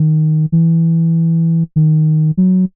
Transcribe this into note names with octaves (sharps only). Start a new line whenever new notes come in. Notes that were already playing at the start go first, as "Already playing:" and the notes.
Already playing: D#3
E3
D#3
F#3